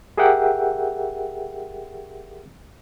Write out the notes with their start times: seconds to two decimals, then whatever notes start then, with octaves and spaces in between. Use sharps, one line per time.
0.17 G4 G#4 A#4 E5 F#5 G5